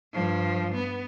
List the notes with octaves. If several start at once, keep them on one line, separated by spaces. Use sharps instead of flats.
G2 F3
B3